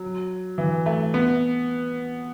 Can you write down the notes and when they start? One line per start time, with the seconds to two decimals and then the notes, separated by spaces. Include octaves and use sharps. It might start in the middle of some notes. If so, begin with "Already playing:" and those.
Already playing: F#3
0.58 E3
0.86 A3
1.14 B3